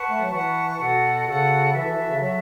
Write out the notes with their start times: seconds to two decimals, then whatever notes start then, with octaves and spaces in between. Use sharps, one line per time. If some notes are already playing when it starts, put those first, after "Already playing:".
Already playing: B4 F#5 A5 C#6
0.09 A3
0.21 F#3
0.32 E3 B4 F#5 A5 C#6
0.80 B2 F#4 A4 F#5
1.27 C#3 F#4 A4 F#5
1.74 E3 F#4 A4 E5
1.86 E3
1.97 E3
2.09 C#3
2.21 F#3 F#4 A4 E5